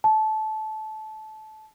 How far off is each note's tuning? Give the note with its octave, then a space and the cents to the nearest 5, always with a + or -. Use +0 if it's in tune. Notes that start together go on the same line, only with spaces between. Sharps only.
A5 -20